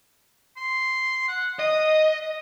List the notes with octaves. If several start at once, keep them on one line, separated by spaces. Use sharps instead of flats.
C6
F#5
D#5 D#6